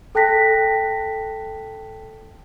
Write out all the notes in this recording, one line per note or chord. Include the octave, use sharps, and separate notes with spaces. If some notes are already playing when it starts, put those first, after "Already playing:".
A4 G5 A5 F#6 A#6 B6